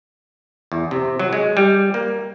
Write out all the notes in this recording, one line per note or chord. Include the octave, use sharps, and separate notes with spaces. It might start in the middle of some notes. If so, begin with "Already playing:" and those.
E2
C3
F#3
G#3
G3
A#3